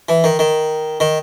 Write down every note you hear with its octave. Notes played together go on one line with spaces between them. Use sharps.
E3
D#3
D#3
D#3